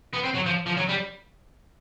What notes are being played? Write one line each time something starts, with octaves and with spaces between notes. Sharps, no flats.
B3
C4
F#3
F3
F3
F#3
G3